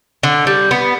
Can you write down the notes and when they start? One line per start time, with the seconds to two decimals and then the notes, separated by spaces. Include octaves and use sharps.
0.23 D3
0.47 G3
0.71 B3